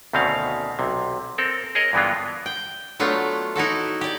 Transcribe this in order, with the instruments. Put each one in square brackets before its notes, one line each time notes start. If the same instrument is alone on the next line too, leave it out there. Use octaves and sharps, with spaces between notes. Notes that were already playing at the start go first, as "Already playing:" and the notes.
[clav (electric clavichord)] D2 B2 D#3 C4 C#4 F5
B1 C3
C4 A4 A#4
G#4 A#4 C#5 D#5
G2 D3 E3 G#3 B3 F4
[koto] G5
F#3 A3 B3 D4 F4
D#4 E4 F#4 A4
G4 D5